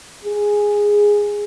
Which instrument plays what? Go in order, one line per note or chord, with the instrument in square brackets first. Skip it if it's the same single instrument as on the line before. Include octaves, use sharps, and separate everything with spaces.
[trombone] G#4